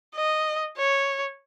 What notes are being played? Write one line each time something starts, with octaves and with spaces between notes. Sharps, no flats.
D#5
C#5